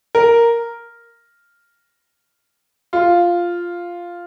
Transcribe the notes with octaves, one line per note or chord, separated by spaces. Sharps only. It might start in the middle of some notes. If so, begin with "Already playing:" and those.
A#4
F4